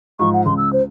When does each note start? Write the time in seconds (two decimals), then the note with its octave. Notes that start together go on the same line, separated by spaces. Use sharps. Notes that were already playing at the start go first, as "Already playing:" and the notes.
0.19 G#2 F3 C#6
0.33 F#5
0.46 C#2 C6
0.57 E6
0.73 C5